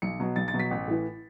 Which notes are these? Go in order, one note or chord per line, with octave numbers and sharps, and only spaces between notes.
B1 C#7
B2 F#3
B1 A6
A6
B2 F#3
B6
A1
A2 E3